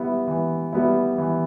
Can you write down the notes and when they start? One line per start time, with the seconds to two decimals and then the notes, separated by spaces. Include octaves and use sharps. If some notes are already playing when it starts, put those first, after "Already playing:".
Already playing: G3 B3 E4
0.28 E3
0.73 G3 B3 E4
1.18 E3